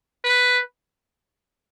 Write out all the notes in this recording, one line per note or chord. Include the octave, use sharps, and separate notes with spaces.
B4